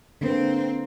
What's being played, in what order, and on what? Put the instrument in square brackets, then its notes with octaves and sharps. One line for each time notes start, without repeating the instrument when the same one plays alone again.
[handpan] D3 A#3 B4 [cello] C4